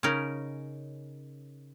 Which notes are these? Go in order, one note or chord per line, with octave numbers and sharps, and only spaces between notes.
C#3 C#4 D#4 A#4